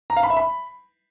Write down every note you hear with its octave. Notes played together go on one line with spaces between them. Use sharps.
A#5
F5
B5
E5
B5